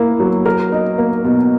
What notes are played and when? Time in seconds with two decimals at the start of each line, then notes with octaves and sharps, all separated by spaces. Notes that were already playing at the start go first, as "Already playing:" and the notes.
Already playing: A#3 E4
0.20 F#3
0.46 A#4
0.72 D#4
0.98 A#3
1.24 B2